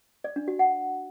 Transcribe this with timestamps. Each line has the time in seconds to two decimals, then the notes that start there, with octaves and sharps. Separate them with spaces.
0.24 D5
0.36 D4
0.48 F#4
0.59 F#5